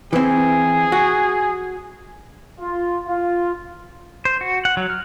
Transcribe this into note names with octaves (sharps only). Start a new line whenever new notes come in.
E3 C4 G#4
F#4
F4
F4
C5
F#4
F#5
F#3
F6